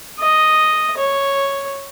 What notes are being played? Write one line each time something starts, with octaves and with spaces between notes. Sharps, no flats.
D#5
C#5